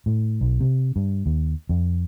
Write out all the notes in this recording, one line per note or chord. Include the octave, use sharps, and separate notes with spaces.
A2
B1
C3
G2
D#2
F2